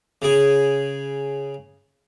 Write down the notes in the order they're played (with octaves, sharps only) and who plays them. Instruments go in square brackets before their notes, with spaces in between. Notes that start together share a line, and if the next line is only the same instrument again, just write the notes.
[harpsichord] C#3 G#4